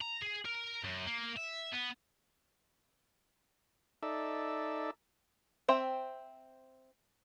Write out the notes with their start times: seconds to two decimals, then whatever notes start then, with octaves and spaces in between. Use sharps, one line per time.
0.01 A#5
0.22 G#4
0.45 A#4
0.84 F#2
1.07 A#3
1.37 E5
1.73 B3
4.03 D#4 A4 D5 E5
5.68 C4 C5 E5 G5